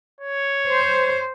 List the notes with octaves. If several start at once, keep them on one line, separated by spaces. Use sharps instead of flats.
C#5
C5